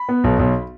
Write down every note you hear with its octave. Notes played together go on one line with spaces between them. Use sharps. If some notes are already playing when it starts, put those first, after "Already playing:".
Already playing: B5
B3
B1
B1